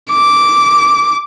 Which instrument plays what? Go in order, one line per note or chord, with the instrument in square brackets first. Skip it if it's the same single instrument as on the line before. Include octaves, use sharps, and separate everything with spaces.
[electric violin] D6